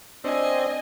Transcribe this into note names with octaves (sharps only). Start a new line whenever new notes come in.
C4 D4 D#5 G#5